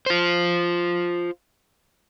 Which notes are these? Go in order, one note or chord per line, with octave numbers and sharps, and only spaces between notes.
F4 C5